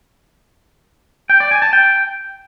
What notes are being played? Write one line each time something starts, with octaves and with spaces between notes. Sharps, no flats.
G5
D5
G#5
A5
G5